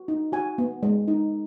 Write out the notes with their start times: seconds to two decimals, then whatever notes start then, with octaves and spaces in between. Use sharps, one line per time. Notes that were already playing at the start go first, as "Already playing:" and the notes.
Already playing: F#4
0.08 D#4
0.32 F#4 G#5
0.58 B3
0.83 G#3
1.08 D#4